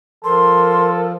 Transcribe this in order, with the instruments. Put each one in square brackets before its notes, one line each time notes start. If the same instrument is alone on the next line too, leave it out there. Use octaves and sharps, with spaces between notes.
[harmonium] F3 [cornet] A4 [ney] A#4 [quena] C6